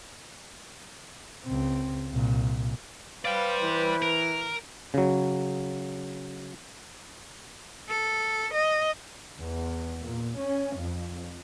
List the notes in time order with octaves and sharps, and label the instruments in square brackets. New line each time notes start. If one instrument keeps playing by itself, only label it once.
[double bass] C#2 C4
C2 A#2
[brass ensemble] B4 C5 [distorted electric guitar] D5 G5 [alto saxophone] F5
[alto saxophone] E3
[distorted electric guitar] A#4
[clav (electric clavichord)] C#3 F#3
[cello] A4
D#5
[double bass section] E2
A#2
C#4
F2